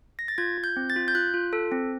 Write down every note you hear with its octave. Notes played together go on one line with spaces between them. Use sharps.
A#6
A6
F4 G#6
F4
G6
C4
A6
F4
G6
F4 F#6
F4
A4
C4